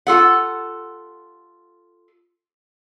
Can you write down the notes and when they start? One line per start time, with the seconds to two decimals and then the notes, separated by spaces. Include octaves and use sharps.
0.07 F4 A4 F#5